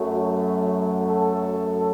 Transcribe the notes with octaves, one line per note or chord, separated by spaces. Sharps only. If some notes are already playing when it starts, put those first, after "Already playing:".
Already playing: F#2 F#3 A3
A4